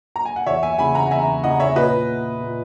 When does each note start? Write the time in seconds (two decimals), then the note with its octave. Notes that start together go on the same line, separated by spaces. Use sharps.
0.16 A#5
0.25 G#5
0.36 F#5
0.46 E2 C#5 E5
0.63 E5 G#5
0.79 C#3 E3 G#5 B5
0.95 F#5 A#5
1.11 E2 E5 G#5
1.44 C#3 E3 D#5 F#5
1.60 C#5 E5
1.76 A#2 B4 D#5
2.40 A#2